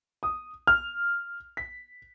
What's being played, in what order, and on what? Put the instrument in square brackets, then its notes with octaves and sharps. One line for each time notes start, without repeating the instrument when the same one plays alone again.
[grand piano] D#6
F6
B6